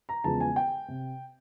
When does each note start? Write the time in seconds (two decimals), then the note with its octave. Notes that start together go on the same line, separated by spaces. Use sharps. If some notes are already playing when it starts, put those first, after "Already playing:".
0.09 A#5
0.24 E2 C#3 F3 G#3 B3 A5
0.40 G#5
0.56 G5
0.88 C3